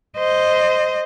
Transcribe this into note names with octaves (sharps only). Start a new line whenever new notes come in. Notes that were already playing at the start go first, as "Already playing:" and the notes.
C5 D#5